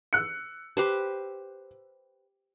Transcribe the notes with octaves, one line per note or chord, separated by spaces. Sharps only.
E6 F#6 C#7
G4 B4 C5